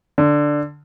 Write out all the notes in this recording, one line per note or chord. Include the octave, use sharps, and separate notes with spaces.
D3